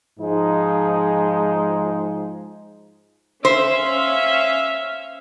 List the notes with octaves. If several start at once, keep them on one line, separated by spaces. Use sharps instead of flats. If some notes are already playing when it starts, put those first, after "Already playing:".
G#2 F3 G#3 D#4
C#4 C5 E5 F5